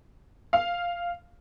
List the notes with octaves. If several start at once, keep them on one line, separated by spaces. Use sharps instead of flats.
F5